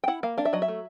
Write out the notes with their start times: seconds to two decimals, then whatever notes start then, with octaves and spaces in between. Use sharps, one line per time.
0.04 G5
0.08 E4 F#5
0.23 A#3 F5
0.38 D4 F5
0.45 E5
0.53 F#3 D#5
0.62 E5
0.68 A3